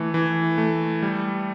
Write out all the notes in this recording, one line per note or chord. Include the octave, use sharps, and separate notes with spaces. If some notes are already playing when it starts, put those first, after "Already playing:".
Already playing: E3 A3
E3
A3
G3